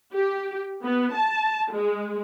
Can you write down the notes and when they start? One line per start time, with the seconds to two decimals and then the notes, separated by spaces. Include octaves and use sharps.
0.14 G4
0.84 B3
1.15 A5
1.73 G#3